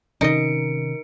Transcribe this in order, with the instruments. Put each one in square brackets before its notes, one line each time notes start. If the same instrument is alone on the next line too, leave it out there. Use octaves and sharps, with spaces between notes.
[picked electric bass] C3 D#3 C#4 [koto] D#4 D#5 [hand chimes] A#4 C#7 D7